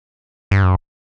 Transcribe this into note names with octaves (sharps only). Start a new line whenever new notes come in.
G2
F#2